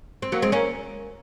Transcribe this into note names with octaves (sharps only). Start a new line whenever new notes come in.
C4
F#3 A#3
G#3 C4
A#3 C#4